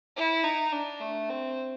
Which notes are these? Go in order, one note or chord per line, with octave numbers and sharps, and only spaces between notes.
E4
D#4
D4
A3
C4